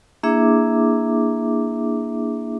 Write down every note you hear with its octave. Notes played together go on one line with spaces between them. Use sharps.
A#3 D4 E4 G#4 E5 D6